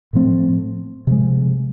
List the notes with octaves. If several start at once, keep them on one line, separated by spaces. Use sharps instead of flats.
A2 F3 A3 C4
C3 F3 G#3